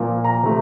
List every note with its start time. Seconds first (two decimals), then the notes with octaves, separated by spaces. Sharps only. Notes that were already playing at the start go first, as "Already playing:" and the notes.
Already playing: A#2 F3 A#3
0.24 A#5
0.43 C3 F3 A3